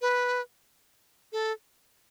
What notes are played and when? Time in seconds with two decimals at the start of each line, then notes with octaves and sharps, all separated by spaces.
0.01 B4
1.32 A4